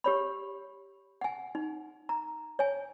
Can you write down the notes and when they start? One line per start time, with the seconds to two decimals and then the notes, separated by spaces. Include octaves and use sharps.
0.04 G4 C#5 B5
1.21 F#5 G#5
1.55 D#4
2.09 A#5
2.59 C#5 G#5